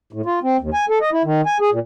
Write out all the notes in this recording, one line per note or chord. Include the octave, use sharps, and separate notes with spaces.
A2
F4
C4
D#2
G#5
A4
D#5
E4
D#3
G#5
G#4
A#2